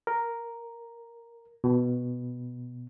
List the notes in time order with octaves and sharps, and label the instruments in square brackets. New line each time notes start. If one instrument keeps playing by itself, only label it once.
[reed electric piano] A#4
B2